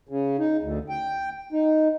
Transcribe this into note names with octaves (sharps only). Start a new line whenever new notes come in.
C#3
D#4
D2
G5
D#4